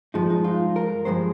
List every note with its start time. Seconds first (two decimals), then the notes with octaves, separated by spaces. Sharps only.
0.14 G2 F3 G#3 D#4
0.30 D#4
0.44 F4
0.76 A#4
1.05 G2 F3 G#3 C5